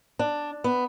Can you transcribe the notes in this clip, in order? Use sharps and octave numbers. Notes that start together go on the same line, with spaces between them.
D4
B3